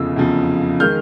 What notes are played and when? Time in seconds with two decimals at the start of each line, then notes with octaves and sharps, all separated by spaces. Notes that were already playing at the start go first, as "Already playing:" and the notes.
Already playing: F1 E2 C#3 F3 E6
0.15 F1 E2 C#3 F3
0.80 D#3 G#3 F6 G6